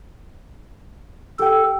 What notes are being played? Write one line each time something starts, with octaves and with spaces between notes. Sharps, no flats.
G4 A4 G5